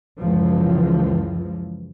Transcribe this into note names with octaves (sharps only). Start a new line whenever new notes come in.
C#2 F#2 E3 F3